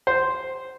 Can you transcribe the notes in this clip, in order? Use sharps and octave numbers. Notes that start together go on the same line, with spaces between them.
C5